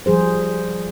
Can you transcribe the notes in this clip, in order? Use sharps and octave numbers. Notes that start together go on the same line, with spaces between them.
F3 G3 G#4 C5